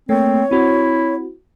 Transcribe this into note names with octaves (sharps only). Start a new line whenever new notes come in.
A3 A#3 C4 C#5
C4 E4 F#4